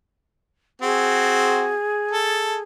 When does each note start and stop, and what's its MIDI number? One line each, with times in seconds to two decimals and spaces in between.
0.82 1.74 60
0.82 1.74 66
0.82 2.63 68
2.11 2.57 69